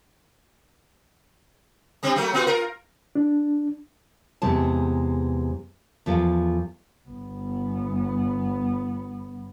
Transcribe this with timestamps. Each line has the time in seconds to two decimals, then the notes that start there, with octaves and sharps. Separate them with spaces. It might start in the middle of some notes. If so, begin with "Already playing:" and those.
2.03 G3 C4 D4
2.16 F#3 A3 A#3
2.33 B3 F4 F#4
2.47 F4 A#4
3.15 D4
4.42 E2 C3 G#3 B3 A5
6.06 E2 F3 A4
7.10 G1 B3